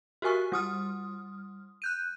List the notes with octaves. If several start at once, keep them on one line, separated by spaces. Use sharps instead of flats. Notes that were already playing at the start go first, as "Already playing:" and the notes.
F#4 G4 A#4 G#5 C#6
G3 D#6 F6
F#6 G6 D#7